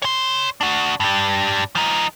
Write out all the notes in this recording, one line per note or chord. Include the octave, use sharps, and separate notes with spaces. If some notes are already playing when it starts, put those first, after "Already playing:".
C#5 C6
D4 F#4
G2 G3
F3 D#4